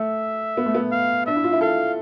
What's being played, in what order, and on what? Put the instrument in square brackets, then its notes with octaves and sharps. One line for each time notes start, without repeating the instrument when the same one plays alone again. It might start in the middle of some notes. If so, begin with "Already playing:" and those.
Already playing: [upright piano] A3 [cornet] E5
[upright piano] B3
A3
B3
[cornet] F5
[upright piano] D4 [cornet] E5
[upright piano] E4
F4
E4
[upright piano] A4 [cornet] F5